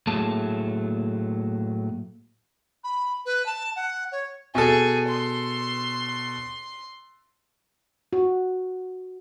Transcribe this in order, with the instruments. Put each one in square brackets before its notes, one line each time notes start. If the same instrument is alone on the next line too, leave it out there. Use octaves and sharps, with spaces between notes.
[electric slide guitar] A2 F#3 A3 A#3 G#4 A5
[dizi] B5
B4
A5
F#5
C#5
[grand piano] B2 A4 [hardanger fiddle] G#4
[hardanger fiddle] C6
[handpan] F#4